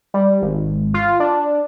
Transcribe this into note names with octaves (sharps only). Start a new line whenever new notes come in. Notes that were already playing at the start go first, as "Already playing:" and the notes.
G3
G#1
F4
D4